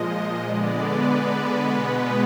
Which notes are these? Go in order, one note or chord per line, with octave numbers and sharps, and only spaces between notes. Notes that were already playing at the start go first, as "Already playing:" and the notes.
Already playing: A#2 F3 G#3 D#5
D3 G#3 B3 D5
B4
B2 G#3 B3